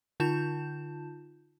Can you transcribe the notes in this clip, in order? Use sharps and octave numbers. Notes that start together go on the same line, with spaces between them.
D3 D#4 F4 A5 G6 E7